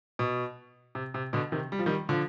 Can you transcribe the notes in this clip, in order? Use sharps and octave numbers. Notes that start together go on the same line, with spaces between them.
B2
C3
C3
B2 D3
C3 D#3
G3
F3
D#3 G3
D3 F3